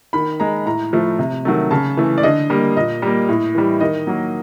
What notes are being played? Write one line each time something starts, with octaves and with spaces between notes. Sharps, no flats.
D#3 B5
G#3 A#5
A2 A#5
F3 A3
C3
D#3 F#3 A3
C#3 A5
E3 A3
D5
D3 D#5
G3 A#3
A#2 D#5
G3 A#3
A2
E3 G3
D#3 D#5
F#3 A#3